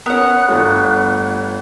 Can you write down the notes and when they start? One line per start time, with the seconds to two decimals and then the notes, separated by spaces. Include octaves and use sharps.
0.06 B3 C#4 A#4 F#5 F#6
0.49 G1 G2 A3 F4 C#5